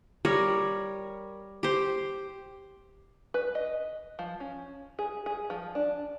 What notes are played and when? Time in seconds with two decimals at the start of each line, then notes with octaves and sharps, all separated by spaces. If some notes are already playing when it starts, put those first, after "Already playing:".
0.25 G3 A#4 C#5
1.63 G4 C5
3.34 B4
3.55 D#5
4.19 F3
4.40 C#4
4.99 G#4
5.26 G#4
5.50 F3
5.75 D4